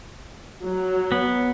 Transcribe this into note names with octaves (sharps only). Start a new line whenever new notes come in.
F#3
B3